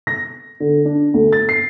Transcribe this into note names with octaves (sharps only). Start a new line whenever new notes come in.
A#6
D3
D4
D2
A6
C7